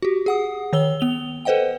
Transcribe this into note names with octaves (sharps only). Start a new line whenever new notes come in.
F#4 G4
G#4 F#5 D#6
D#3 C#5 E6 G7
B3 F7 G7
A4 B4 C5 D#5 F#5 G5